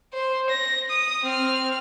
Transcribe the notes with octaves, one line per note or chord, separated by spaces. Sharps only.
C5
A#6
D#6
C4 F6